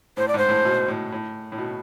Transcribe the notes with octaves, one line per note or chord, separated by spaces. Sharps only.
A2 C5
D5
G#2 C5
A2
B2
A2
A2
A2
B2